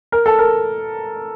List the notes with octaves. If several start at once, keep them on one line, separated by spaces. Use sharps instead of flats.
A#4
A4
A#4